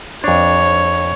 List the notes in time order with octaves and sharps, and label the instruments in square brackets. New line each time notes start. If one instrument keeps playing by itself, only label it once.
[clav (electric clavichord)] F2 D4 [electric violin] C#5